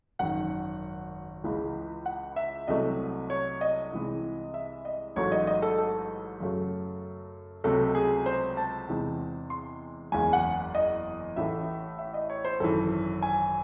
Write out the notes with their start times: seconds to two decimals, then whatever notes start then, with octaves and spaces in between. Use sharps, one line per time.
0.19 G#1 F#2 D#3 F#5
1.44 C#2 C#3 E3 G#3
2.06 F#5
2.36 E5
2.68 C2 C3 F#3 A3 D#5
3.30 C#5
3.61 D#5
3.92 C2 C3 E3 G#3
4.54 E5
4.85 D#5
5.16 A1 G#2 F#3 A3 C#5
5.32 D#5
5.47 D#5
5.62 A4
5.78 A4
6.40 F#2 C#3 F#3 A3
7.64 C#2 C3 F#3 A3 A4
7.95 G#4
8.26 C5
8.57 A5
8.89 E2 C3 E3 G#3
9.50 C6
10.12 F#1 E2 C#3 G#3 G#5
10.33 F#5
10.75 D#5
11.36 A1 A2 E3 A3 E5
11.98 E5
12.14 D#5
12.30 C#5
12.44 C5
12.60 G#1 F#2 E3 A4
13.22 G#5